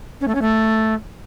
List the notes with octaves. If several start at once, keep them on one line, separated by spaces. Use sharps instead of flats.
C#4
A3
C#4
A3